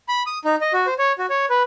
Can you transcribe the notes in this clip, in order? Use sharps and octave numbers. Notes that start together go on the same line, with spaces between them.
B5
D#6
D#4
D#5
F#4
C5
C#5
F#4
C#5
B4